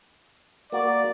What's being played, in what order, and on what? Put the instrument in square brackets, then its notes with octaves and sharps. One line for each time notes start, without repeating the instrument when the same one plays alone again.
[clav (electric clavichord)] A#3 F#4 [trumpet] D5